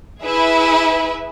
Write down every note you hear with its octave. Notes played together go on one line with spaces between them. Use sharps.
E4 G#4 B4 E5